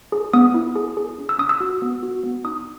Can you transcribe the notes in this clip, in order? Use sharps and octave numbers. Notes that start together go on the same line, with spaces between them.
G#4
B3 D#6
E4
G#4
G#4
C#4
E6
C#4 D#6
E6
F#4
B3
F#4
B3
D#4 D#6